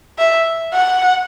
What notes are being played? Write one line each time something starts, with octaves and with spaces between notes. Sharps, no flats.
E5
F#5